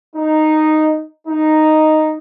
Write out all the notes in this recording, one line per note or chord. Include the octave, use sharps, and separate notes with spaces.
D#4
D#4